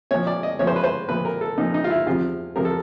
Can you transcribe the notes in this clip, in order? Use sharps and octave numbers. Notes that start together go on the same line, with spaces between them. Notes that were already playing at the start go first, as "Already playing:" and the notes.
A#2 F3 C#5
D5
D#5
A#2 F3 C#5
C5
B4
C5
A#2 F3 B4
A#4
A4
A#2 F3 D#4
D#4
F4
E4
E2 C3 F3 F4
E2 C3 F3 A#4
A4